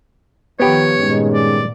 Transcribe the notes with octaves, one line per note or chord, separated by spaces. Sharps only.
D#3 F3 B3 G4 C#5
G2 A#2 D#3 G#3 C#4
D5